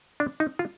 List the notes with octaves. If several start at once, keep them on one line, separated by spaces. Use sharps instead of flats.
D4
D#4
F4